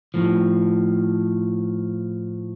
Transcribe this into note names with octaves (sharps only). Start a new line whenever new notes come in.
A2 F3